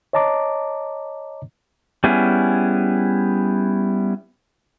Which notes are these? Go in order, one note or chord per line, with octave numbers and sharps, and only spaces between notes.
C#5 D#5 A5 A#5 D6
G3 B3 C#4 E4 G#4